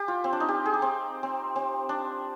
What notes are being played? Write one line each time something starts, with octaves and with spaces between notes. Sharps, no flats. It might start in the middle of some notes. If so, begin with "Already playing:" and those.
Already playing: G4
F4
C4
D4
D#4
G4
G#4
G4
C4
C4
C4
D4